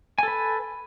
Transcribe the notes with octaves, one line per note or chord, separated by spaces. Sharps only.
A4 B4 G#5